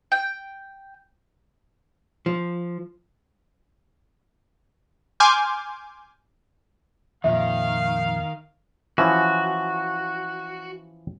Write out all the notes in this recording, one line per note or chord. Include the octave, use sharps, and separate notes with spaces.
G5
F3
G#5 C6 D6 F6 G6
F2 A#2 D#3 F3 E5 F5
E3 F3 C#4 F#4